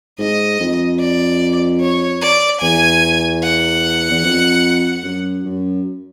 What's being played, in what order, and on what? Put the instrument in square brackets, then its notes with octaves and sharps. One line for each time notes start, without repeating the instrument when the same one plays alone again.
[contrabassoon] G#2 [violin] D#5
[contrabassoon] F2
[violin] D5
C#5
D5
[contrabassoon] E2 [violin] G#5
[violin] F#5
[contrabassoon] E2
F2
F#2
F#2